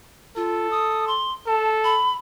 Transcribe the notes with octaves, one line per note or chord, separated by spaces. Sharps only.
F4 A4
D#6
C6
A4 A5
B5